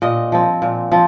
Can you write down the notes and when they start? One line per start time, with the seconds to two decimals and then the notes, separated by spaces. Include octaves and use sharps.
0.02 A#2 D#5
0.32 F3 C4
0.62 A#2
0.92 F3 C4